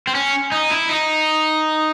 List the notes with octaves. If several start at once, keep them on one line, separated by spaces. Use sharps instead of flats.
C4
C#4
D#4
E4
D#4